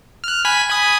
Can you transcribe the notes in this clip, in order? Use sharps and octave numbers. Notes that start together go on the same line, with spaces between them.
F6 F#6
G#5 B5 B6
G#5 B5 D#6